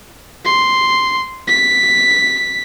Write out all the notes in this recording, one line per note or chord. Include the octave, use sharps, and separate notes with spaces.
C6
B6